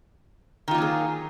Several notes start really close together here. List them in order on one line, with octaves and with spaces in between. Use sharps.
D#3 F4 A#3 F#3 G#4